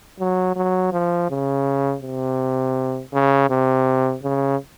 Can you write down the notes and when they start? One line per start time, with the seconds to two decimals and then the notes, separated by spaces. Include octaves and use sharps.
0.20 F#3
0.56 F#3
0.92 F3
1.30 C#3
2.03 C3
3.13 C#3
3.50 C3
4.23 C#3